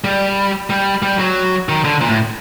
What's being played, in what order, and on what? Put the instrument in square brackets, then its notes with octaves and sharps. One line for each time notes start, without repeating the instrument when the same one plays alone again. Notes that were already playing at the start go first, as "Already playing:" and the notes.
[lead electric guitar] G3
G3
G3
F#3
D#3
D3
A#2
A2